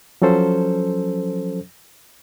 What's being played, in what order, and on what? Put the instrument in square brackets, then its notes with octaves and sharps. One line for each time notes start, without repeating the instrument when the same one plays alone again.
[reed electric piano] F3 F#3 C#4 A4 C5